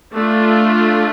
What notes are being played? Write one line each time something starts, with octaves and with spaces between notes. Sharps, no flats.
A3 D4 F4